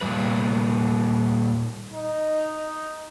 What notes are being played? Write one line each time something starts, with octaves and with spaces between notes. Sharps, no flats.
A#2 C#3 G3 B4
D#4